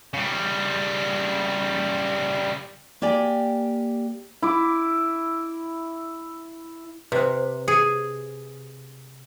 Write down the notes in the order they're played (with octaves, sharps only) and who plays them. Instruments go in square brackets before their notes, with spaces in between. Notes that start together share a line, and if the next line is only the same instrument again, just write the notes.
[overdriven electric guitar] C#3 G3
[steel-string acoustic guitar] A#3 G4 D5 G5 G#5
[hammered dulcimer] E4 D6
[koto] C3 [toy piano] B4 C5
[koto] G#4